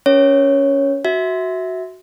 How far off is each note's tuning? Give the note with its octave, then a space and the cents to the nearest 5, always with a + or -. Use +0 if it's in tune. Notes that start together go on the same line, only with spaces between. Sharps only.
C#4 +15 A#4 +35 C#5 -5
F#4 +0 E5 -15